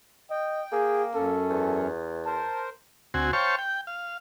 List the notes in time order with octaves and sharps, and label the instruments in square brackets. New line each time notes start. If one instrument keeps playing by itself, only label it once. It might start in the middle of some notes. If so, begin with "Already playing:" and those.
[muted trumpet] D#5 [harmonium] G5
[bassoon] A#3 [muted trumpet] G#4
[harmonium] F#2 C#4 [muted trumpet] A4
[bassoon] E2
[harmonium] A#4 C5 [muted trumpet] A5
[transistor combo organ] D2 C4 F#4 G#5
C5 C#5 F5 G5 A5 C#6
G5
F5